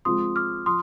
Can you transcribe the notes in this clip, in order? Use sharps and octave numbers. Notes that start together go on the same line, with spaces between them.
F3 G#3 C4 F4 C6 D#6
D6 F6
F3 C6 D#6